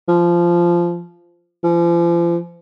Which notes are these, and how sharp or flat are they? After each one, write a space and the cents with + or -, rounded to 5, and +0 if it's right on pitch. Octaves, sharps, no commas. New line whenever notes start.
F3 -15
F3 -40